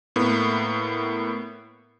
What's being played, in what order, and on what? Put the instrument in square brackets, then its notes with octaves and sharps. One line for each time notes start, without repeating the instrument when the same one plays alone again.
[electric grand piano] A2 A#3 B3